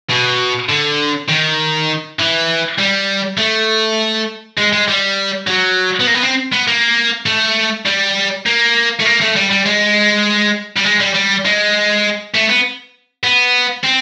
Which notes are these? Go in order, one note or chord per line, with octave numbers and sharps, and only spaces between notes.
B2
D3
D#3
E3
G3
A3
G#3
G#3
G3
F#3
B3
A#3
B3
C4
B3
A#3
A3
G3
A#3
A3
A#3
A3
G3
G3
G#3
G3
G#3
G3
G3
G#3
A3
B3
B3
C4